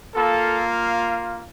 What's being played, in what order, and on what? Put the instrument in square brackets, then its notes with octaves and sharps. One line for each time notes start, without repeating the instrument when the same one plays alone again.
[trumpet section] A#3 F4 A4